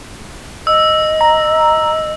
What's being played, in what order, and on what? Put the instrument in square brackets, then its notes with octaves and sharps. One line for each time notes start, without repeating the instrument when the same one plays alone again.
[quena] D#5 [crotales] E6
[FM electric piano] A#5